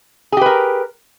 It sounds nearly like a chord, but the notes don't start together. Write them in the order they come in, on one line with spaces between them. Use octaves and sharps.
G#4 G4 B4 A#4